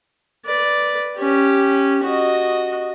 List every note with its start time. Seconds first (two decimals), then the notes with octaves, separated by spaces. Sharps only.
0.46 B4 D5
1.17 C#4 G4
2.04 F#4 D#5